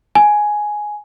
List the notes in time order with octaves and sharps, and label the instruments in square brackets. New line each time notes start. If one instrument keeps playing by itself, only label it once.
[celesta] G#5